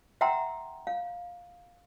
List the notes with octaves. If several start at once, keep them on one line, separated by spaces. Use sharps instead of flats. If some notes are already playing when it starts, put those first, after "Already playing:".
E5 F#5 G5 A#5 C6 E6
F5